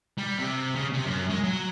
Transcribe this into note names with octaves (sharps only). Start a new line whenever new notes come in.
G3
C3
C#3
C3
F#2
G#3
F#3